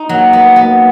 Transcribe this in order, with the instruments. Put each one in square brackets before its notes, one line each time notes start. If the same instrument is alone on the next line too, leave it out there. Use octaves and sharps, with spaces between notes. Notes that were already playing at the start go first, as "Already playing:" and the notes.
Already playing: [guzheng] D#4
[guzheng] F#3 [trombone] A#3
[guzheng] B3
B3